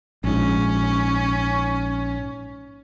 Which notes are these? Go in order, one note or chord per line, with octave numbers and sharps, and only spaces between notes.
A#1 G#2 C#4